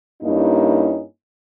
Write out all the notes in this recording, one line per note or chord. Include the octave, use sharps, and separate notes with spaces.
G2 A#3 C#4 D#4 E4